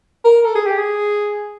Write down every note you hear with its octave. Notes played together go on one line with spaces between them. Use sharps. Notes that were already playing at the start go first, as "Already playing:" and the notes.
A#4
A4
G#4
G4
G#4